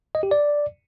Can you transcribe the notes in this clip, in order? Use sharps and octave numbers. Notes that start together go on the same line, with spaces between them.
D#5
G4
D5